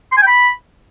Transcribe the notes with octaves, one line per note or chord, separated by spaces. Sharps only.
C6
G#5
G5
B5